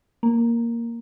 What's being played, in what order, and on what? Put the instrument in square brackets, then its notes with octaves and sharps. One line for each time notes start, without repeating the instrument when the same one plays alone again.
[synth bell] A#3